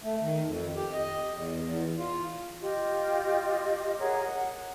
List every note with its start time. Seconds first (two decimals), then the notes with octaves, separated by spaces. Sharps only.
0.03 A3
0.21 D#3
0.47 F2
0.76 G4
0.93 D#5
1.33 E2
1.63 E2
1.98 F4
2.61 F4 G4 D#5
3.98 G#4 A#4 C#5 F#5
4.21 F#5